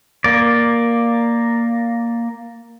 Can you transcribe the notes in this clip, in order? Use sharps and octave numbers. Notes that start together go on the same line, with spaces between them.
A#3 D5